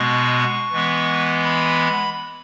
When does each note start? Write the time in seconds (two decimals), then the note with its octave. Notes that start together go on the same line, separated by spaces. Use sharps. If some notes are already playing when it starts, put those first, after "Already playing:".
Already playing: B2 G#3 B3 C#6
0.73 E3 G#3 B3
1.45 B5